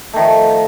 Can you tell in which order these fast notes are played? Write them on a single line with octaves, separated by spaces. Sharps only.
A3 D#3 F3